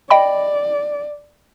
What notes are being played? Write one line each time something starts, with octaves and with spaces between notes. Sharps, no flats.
D5 D#5 G5 B5